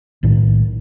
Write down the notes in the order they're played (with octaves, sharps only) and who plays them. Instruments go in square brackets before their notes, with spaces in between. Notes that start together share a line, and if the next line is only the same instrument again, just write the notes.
[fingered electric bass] B1 A2 D#3